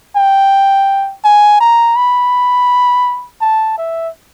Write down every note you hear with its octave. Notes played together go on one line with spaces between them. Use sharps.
G5
G#5
A#5
B5
A5
E5